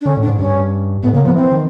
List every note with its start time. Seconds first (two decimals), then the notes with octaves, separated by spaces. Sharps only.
0.01 D4
0.06 D3 C#4
0.17 A2
0.22 D4
0.27 G#2
0.38 G2 C#4
1.03 A2 B3
1.13 C#3 A#3
1.25 F3 B3
1.35 E3 C4
1.52 D#3